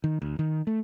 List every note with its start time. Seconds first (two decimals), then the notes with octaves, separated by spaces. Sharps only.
0.04 D#3
0.22 D2
0.39 D#3
0.67 A3